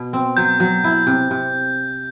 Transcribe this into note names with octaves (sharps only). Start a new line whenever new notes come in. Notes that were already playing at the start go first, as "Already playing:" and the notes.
Already playing: B2
C4
F#3 G6
F#3
E4
C3
C3